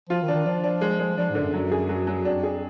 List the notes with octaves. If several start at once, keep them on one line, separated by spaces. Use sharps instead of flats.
F3 F4
D#3
D4
D#3
F3 D4
D4
G#3
G#3
F3 D4
G#2
D3
F#2
F#2 F#3
G#4
F#3
F#3
F2 D4
G#4